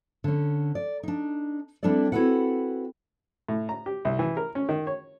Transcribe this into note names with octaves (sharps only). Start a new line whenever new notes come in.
D3 C#4
D5
D4 D#4
G3 C4 D4 E4 A4 D5
C4 E4 F#4 A4 B4 F#5
A2
A#5
G4
C2
E3
A#4
C#4
D#3
C#5